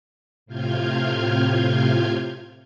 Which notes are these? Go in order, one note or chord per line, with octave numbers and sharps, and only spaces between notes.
A2 C3 F4 F6 G6 G#6